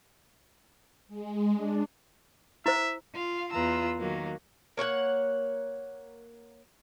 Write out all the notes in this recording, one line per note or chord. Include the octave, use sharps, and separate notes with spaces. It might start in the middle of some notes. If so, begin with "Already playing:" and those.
G#3
D4
E4 C5 E5
F4 F5
E2 F4 B4 A#5 E6
D#3 F#3 A#3
A#3 C#5 F5 F#5